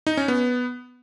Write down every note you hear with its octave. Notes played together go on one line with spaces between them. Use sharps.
D#4
C#4
B3